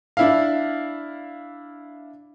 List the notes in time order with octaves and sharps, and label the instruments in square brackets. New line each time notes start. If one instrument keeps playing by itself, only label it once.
[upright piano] D4 E4 F5